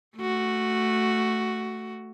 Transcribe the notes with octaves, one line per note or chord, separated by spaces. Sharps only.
A3 F#4